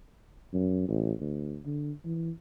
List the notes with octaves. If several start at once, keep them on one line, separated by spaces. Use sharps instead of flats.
F#2
A1
D2
D3
E3